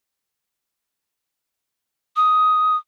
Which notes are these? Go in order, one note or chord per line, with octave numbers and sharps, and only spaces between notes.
D#6